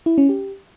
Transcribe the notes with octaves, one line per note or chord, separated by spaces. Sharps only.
E4
C#4
G4